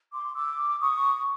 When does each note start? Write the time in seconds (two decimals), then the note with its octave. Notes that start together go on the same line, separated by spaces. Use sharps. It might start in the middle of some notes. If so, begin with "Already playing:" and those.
0.13 C6 D6
0.35 D6 E6
0.81 C#6 D#6